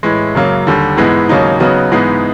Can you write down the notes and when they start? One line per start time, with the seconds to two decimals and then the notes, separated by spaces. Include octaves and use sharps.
0.03 A2 E3 G#3
0.35 F#2 C#3 F#3 A#3
0.67 D#2 D3 G3
0.97 G#2 E3 G#3 B3 E4
1.29 D#2 C#3 F#3 A#3 D#4
1.60 C#3 F#3 B3 D#4 F#4
1.92 G#2 E3 G#3 B3 D#4